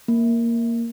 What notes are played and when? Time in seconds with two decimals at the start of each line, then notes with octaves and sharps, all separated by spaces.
0.08 A#3